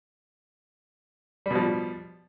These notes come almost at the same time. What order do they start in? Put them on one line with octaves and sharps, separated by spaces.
G3 B2 F3